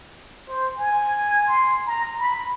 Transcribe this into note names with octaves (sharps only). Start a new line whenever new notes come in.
C5
G#5
C6
A#5
B5